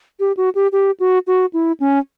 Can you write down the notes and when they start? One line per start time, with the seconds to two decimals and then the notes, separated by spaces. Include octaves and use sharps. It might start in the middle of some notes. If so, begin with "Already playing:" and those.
0.20 G4
0.37 F#4
0.55 G4
0.72 G4
1.00 F#4
1.27 F#4
1.53 E4
1.80 C#4